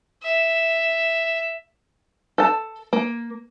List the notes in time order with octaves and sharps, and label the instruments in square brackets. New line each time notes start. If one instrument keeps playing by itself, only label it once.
[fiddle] E5
[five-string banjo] A4 A5
A#3